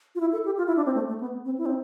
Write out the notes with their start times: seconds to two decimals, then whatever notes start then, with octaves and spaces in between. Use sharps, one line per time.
0.15 F4
0.20 E4
0.32 A4
0.45 G4
0.57 F4
0.67 E4
0.77 D4
0.86 C4
0.95 A3
1.08 A3
1.20 B3
1.45 C4
1.58 E4
1.66 C4